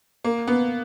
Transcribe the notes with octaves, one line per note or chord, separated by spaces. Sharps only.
A#3
B3